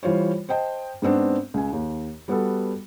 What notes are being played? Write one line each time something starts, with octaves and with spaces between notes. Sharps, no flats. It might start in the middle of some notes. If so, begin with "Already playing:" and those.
E3 G3 F4 C5 C#5
C5 D#5 G5 A5
G#2 B3 C4 D4
C#2 G#5
D#2
G3 B3 F#4 A4